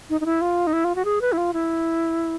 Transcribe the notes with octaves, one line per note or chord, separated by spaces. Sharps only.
D#4
D#4
E4
F4
D#4
E4
F4
F#4
G#4
B4
E4
F4
E4